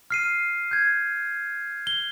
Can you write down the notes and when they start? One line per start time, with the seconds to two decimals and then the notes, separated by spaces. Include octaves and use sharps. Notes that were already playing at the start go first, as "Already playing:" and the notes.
0.10 F6 C7 D#7
0.71 G6 G#6
1.87 G7